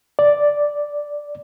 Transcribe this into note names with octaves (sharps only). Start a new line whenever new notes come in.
D5